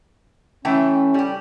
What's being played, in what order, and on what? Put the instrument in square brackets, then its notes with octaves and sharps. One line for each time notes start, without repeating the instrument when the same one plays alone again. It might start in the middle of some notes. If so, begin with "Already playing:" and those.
[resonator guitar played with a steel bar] E3 A3 G5 [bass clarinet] C#4
[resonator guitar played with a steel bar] G3 G4